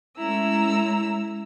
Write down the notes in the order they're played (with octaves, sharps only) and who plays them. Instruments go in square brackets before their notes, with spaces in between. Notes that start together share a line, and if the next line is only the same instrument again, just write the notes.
[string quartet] G#3 A3 C#4 E4 A#5 E6